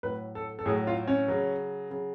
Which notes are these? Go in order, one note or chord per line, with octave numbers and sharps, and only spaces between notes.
A2 F#3 B4
A4
A4
A2 F#3 G#4
F4
C#4
C#3 F#3
C#3 F#3